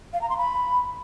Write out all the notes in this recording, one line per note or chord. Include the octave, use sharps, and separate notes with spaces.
F5
A#5
C6
B5